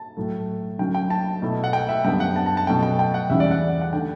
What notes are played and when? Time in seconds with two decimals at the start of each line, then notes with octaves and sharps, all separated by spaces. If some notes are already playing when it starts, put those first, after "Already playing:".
Already playing: A5
0.17 A2 F#3 A3
0.79 D3 F#3 C#4 G5
0.95 G5
1.10 A5
1.42 B2 A3 E4
1.64 F#5
1.73 G5
1.89 E5
2.04 F#2 D3 G3 B3 D4 G5
2.20 F#5
2.36 A5
2.46 A5
2.57 A5
2.67 B2 F#3 A3 C#4 G5
2.83 G5
2.99 G5
3.14 F#5
3.30 E2 C#3 G3 C#4 E4 E5
3.40 D5
3.51 F#5
3.81 F#5
3.93 D3 A3 D4 G5